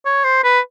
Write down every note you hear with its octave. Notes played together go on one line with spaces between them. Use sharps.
C#5
C5
B4